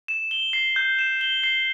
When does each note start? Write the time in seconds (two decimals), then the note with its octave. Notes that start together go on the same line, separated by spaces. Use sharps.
0.08 E7
0.31 G7
0.53 C7
0.76 G6
0.99 E7
1.21 G7
1.43 C7